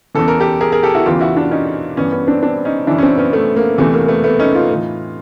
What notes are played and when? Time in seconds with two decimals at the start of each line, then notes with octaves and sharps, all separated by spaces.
0.15 E2 C#3 E3 A4
0.28 A#4
0.40 G4 A4
0.61 G#4 A#4
0.72 G#4 A#4
0.83 G4 A4
0.94 E4 F#4
1.06 E2 C#3 E3 F4 G4
1.21 E4 F#4
1.37 D4 E4
1.51 C#4 D#4
1.97 G2 E3 B3 C#4
2.12 B3 C#4
2.27 C4 D4
2.43 C4 D4
2.65 C#4 D#4
2.87 F#2 C#3 E3 D4 E4
2.98 C#4
3.03 C4 D4
3.17 B3 C#4
3.33 A3 B3
3.56 A#3
3.78 E2 C3 E3 A3
3.94 A#3
4.08 A3 B3
4.24 A3 B3
4.39 C#4 D#4
4.54 D#4 F4
4.69 A2 E3